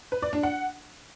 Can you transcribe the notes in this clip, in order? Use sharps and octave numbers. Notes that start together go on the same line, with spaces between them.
B4
D5
D4
F#5